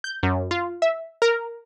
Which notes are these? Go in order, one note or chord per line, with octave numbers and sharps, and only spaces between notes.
G6
F#2
F4
E5
A#4